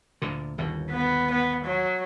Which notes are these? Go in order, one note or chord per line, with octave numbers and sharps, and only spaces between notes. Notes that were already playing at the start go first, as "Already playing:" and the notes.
D2 A#2 D3
G1 D#2 B2
B3
B3
F#3